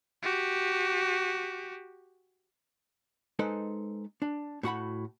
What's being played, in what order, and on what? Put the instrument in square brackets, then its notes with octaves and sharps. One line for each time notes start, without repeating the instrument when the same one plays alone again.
[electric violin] F#4 G4
[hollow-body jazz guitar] G#3 D#4 A4 B4 C5
D4
A2 F#4 F#5 B5